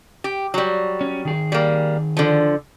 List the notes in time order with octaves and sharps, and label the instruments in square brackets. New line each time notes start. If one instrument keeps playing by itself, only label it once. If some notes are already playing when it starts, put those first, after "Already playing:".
[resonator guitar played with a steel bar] G4
F#3 G3
[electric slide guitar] C#4
D#3 G#4
[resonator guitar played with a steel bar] G3 A#3
D3 F3